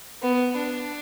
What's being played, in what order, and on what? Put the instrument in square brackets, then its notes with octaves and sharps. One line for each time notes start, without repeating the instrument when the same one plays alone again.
[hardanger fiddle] B3
D4